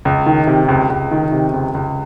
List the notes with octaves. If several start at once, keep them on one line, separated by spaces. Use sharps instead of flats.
C#2
D#3
C3
C#2
C#2
D#3
C3
C#2
C#2